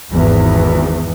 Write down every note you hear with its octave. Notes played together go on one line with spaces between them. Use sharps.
G#1 E2